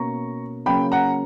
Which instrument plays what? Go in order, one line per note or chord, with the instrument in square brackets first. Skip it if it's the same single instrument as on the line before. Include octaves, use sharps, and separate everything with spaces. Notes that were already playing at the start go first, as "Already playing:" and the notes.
Already playing: [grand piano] B2 A#3 C#4 A#5 C#6
C#3 F#3 A#3 C#4 G5 B5
F#5 A#5